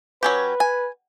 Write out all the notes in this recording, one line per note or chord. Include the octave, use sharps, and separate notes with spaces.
F#3 C#4 G4 B4
G#5